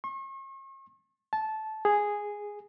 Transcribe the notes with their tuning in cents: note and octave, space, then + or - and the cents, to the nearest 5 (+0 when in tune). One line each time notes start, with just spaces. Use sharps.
C#6 -45
A5 -15
G#4 -5